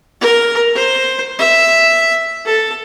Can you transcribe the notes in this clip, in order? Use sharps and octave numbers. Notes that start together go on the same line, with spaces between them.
A#4
C5
E5
A4